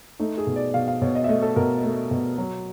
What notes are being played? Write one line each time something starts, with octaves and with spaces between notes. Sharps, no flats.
A3 D#4
G#4
B2
D5
B2 F5
F5
B2 C#5
D#5
E5
A3 D#5
A4
B2 A#4
A3
B2
F#3